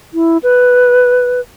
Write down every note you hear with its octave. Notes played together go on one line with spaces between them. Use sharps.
E4
B4